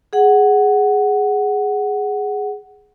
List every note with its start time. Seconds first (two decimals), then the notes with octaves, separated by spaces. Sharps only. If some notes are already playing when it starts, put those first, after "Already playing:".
0.13 G#4 F#5